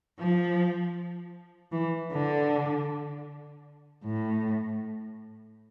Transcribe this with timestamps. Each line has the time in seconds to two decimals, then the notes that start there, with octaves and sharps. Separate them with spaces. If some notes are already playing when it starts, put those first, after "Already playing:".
0.19 F3
1.72 E3
2.12 D3
4.04 A2